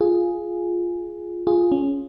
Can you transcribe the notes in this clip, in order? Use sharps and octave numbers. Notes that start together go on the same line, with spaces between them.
F4 G#4
F4 G#4
C#4